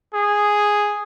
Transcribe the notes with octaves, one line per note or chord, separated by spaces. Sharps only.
G#4